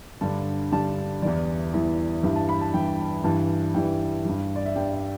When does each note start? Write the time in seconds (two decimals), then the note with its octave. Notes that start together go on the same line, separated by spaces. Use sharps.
0.21 G2 D3 G3 A5
0.72 G2 D3 G3 A5
1.22 E2 E3 G3 D5
1.73 E2 E3 G3
2.23 G2 E3 G3 E5
2.36 A5
2.49 B5
2.61 A5
2.74 G2 E3 G3 G5
3.24 G2 E3 G3 A5
3.74 G2 E3 G3 G5
4.25 G2 G3
4.56 D5
4.66 E5
4.76 G2 G3 G5
4.92 D5